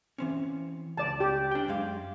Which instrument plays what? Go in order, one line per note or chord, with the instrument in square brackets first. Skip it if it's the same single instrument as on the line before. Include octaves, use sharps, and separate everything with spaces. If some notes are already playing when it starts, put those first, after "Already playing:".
[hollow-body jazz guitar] E3 C4 C#4
[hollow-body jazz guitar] C#2 [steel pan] D5 A5
[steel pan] G4
[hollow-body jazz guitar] D4 G5
F#2 G#3 F5